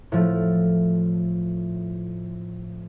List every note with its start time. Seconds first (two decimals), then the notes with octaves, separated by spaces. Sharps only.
0.12 A2 F3 A3